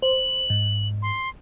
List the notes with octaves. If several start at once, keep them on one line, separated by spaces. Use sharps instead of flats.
C5 F#7
G#2
C6